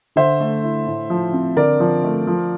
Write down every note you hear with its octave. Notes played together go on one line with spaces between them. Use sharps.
D3 C5 E5
A3
E4
A2
F3
C4
D3 A#4 D5
F3
A3
F3